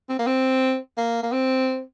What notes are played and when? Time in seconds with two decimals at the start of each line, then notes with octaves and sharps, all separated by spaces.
0.09 C4
0.19 A#3
0.27 C4
0.97 A#3
1.23 A#3
1.33 C4